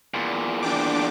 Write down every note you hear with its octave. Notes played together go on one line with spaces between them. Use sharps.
E2 A#2
D4 G5 D6